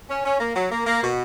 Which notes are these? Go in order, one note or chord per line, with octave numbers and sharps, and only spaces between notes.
C#4
C#4
A#3
F#3
A#3
A#3
B2